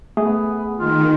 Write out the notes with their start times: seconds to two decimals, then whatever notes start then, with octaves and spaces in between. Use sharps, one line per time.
0.17 A3 B3 G#4
0.78 D#3 F4